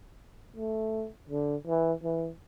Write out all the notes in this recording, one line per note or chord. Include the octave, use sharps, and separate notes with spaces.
A3
D3
E3
E3